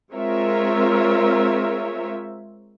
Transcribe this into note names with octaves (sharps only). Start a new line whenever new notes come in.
G#3 C4 F4 A#4 C#5 E5